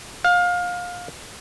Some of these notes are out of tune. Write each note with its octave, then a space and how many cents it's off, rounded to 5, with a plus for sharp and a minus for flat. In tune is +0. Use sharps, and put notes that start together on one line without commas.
F5 +25